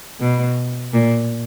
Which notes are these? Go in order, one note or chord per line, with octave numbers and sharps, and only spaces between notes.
B2
A#2